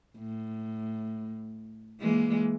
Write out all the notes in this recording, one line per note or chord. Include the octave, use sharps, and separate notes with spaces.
A2
E3 G#3 A#3